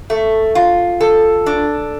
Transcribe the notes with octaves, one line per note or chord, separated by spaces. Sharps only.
A3
F4
A4
D4